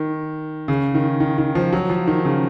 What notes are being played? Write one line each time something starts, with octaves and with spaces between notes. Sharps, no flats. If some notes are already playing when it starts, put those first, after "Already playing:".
Already playing: D#3
C#3
D#3
D#3
D#3
F3
F#3
F3
D#3
C#3